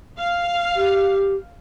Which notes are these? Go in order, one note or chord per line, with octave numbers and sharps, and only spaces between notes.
F5
G4